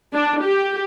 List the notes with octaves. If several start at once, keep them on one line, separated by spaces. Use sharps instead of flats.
D4
G4